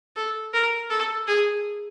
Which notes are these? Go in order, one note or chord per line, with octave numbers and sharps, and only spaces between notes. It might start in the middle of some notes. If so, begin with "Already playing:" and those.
A4
A#4
A4
G#4